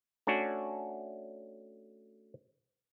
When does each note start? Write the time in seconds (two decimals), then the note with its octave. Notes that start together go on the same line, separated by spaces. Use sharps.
0.27 A3 C#4 D4 F#4